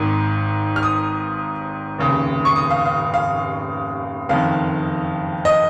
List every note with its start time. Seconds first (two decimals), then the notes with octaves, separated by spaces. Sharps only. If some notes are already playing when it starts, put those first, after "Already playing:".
Already playing: G#1 G#2 D#3
0.76 F6
0.83 D#6
1.99 F1 D#2 C#3
2.45 C#6
2.56 D#6
2.70 F5
2.85 F5
3.14 F5
4.29 F#1 F2 D#3 F5
5.45 D#5